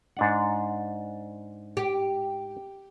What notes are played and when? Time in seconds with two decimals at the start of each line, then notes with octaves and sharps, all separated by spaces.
0.17 G#2 D4 F#5
1.77 G4